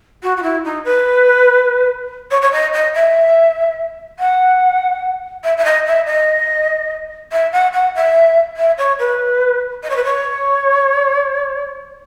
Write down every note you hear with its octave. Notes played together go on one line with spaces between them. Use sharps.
F#4
F#4
E4
D#4
B4
C#5
C#5
D#5
D#5
E5
F#5
E5
E5
D#5
E5
D#5
E5
F#5
F#5
E5
E5
C#5
B4
D#5
C#5
B4
C#5